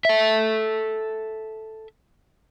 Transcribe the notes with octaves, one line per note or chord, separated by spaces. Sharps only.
A4 E5